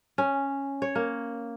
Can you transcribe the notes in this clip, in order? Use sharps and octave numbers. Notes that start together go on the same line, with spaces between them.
C#4
C#5
A#3